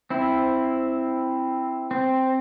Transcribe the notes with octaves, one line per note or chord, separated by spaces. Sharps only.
C4 E4
C4